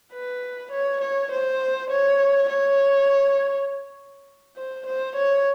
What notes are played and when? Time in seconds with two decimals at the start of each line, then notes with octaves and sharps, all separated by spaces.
0.13 B4
0.72 C#5
1.01 C#5
1.31 C5
1.90 C#5
2.49 C#5
4.57 C5
4.86 C5
5.16 C#5